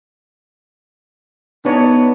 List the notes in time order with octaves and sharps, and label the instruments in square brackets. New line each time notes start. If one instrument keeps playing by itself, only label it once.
[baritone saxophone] B3 [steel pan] D4 D#4 C#5